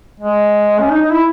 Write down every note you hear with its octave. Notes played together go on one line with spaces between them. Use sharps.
G#3
C#4
D#4
D#4
E4